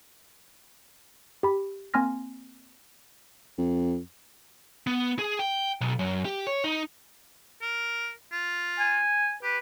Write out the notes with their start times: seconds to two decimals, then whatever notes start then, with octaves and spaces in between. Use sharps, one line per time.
1.43 G4 B5
1.94 A#3 C4 G#5 C6 F6 A#6
3.57 F2
4.87 B3
5.19 G#4
5.39 G5
5.81 B1
5.99 F#2
6.25 G4
6.47 C#5
6.64 D#4
7.62 A#4
8.32 F4
8.79 G#5
9.43 G4 B4